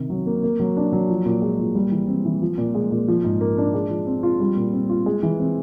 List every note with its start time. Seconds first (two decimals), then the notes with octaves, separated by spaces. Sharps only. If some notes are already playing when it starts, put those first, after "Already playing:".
Already playing: C3 D#3
0.10 F#3
0.26 A#3
0.43 A#3
0.60 F#3
0.77 D4
0.93 F#3
1.09 F3
1.25 A#2
1.42 G#3
1.59 A#2
1.75 G3
1.92 E3
2.08 C4
2.25 E3
2.42 F3
2.58 A#2
2.75 G#3
2.91 A#2
3.08 F3
3.24 G#2
3.41 A#3
3.58 D4
3.74 G#3
3.90 F3
4.07 C4
4.23 F4
4.40 G3
4.56 A#2
4.73 C4
4.89 F4
5.06 G#3
5.23 E3
5.40 C4